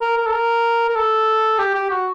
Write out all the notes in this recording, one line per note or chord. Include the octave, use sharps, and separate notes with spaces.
A#4
A#4
A4
A#4
A#4
A4
G4
G4
F#4